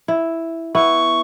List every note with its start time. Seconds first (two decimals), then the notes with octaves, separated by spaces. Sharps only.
0.08 E4
0.75 B3 E4 C#6